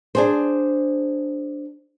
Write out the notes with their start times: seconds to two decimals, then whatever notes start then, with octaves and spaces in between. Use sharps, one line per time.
0.15 D4 G#4 C5